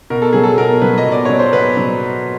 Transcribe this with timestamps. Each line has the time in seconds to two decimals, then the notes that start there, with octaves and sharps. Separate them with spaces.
0.10 B2 A#4
0.22 A4
0.33 F#3 G#4
0.44 A4
0.58 B2 A#4
0.82 F#3 B4
0.98 D#5
1.06 B2
1.12 D5
1.25 F#3 C#5
1.39 C5
1.53 B2 B4
1.77 F#3